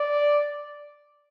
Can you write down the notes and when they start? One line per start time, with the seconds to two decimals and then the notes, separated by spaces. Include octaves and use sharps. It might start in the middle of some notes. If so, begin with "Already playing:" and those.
Already playing: D5